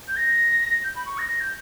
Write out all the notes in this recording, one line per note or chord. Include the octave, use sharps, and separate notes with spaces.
G6
A#6
G6
B5
C#6
A#6
A#6
G6